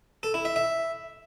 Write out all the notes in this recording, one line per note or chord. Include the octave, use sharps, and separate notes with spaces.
A4
E4
E5
E5